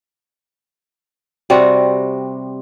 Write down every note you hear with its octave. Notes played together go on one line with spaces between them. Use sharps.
C3 G3 C4 F#4